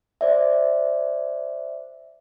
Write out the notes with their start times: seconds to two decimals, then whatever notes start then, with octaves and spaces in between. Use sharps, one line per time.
0.21 C5 D5 E5